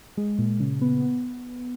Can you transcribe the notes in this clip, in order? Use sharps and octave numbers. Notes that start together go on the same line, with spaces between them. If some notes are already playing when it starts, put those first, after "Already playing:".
G#3
A#2
C#3
B3
B3